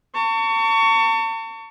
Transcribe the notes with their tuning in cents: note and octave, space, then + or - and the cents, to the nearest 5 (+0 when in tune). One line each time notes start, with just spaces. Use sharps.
A5 +40 C#6 +20